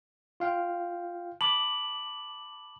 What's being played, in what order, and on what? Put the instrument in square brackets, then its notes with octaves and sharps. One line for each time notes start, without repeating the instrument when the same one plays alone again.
[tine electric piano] F4 F5 G5
[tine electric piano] A5 B5 D6 [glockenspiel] F#7